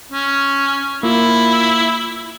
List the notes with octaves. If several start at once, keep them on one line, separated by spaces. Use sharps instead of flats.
C#4
A#3 E4 F4